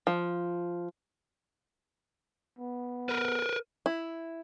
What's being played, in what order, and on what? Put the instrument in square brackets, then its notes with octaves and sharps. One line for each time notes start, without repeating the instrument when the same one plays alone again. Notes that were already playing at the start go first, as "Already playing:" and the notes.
[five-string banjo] F3
[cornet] B3
[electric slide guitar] A#4 B4
[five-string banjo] E4